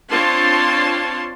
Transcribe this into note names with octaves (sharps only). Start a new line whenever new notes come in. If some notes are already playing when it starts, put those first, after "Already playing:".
C4 D4 F4 C#5 A5 C6